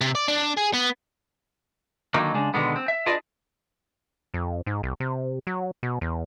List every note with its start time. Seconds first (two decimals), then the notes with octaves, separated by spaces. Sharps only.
0.01 C3
0.15 D5
0.28 D4
0.57 G#4
0.74 B3
2.14 D3 D#3 F#3 A#3 D#4
2.34 C#3 G#3 D4
2.54 B2 D3 D#3 G#3 B3
2.76 C4
2.88 E5
3.06 D4 F4 G#4 B4 D5 D#5
4.34 F2
4.66 G#2
4.83 C2
5.00 C3
5.47 F#3
5.83 B2
6.01 E2